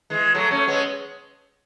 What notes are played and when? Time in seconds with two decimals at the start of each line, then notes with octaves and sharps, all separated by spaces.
0.10 E3 G#3
0.34 F#3 A3
0.51 A3 C#4
0.67 G#3 B3